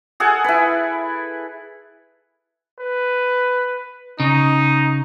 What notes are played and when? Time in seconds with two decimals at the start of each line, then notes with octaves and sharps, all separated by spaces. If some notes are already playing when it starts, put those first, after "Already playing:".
0.20 G#4 A4 F#5 G#5
0.44 E4 B4
2.79 B4
4.20 C#3 D#4